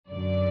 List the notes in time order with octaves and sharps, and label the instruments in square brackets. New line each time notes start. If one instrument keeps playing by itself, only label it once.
[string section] F#2 D3 F#3 D5